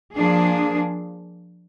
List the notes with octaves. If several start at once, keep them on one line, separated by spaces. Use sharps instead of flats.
F3 A#3 D4 G#4